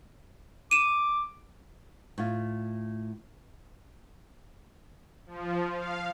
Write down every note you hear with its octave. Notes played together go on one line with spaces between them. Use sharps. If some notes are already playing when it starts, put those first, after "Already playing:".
D6 D#7 E7
A2 F4
F3
F5